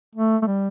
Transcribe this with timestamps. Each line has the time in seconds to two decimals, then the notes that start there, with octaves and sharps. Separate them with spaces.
0.15 A3
0.42 A3
0.47 G3